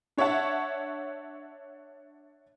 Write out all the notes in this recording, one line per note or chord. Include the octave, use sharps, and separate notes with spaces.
D4 C#5 E5 F#5 A5